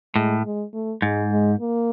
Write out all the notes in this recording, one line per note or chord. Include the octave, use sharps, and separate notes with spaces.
A2 G#3
G#3
A3
G#2 G#3
G#3
A#3